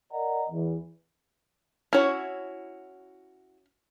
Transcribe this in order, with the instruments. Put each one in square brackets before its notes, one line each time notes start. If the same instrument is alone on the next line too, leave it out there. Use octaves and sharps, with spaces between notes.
[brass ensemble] A#4 D5 D#5 F#5 A#5
E2
[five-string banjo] C#4 C#5 [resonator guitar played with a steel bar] E4 F#4